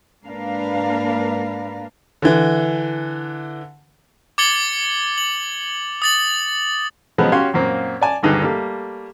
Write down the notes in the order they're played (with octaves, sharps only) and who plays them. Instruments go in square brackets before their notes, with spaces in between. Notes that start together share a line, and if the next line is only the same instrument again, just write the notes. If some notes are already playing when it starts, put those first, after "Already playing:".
[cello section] G#2 A#3 D4 A#4 B4 F5
[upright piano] D3 E3
[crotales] D6 G#6 A6 C#7 F#7 G7
F#7
D#6 A6 F#7
[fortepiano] B2 F3 F#3 G#3 B3
C#4 F#4 G4 C#5 F5 C6
F#2 A#2 A#3 C4
D5 G#5 A5
G#1 D2 G2 D#4 G#4 B4
G3 A3 A#3